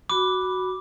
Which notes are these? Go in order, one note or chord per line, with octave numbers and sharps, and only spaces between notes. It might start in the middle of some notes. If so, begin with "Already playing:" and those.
F#4 B5 D6